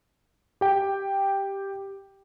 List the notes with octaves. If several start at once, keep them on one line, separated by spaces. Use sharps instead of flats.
G4 G5